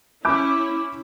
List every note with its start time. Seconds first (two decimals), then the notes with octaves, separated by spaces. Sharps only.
0.25 C#4 E4 B5 D6 G6